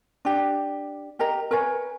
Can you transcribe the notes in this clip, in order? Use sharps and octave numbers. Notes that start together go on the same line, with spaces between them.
D4 G4
G4 A#4 D#5 A#5
A#4 B4 C#5 G#5